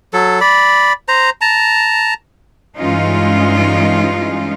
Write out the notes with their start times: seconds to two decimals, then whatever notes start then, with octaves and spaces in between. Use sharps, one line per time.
0.13 F#3 A4
0.41 D5 B5
1.08 C5 A#5
1.41 A5 A#5
2.78 G2 E3 G#3 C#4 D#4 F4